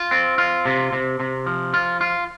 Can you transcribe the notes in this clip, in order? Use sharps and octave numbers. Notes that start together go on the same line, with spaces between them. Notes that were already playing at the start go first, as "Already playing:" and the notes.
Already playing: F4
C4
F4
C3
C3
C3
F3
F4
F4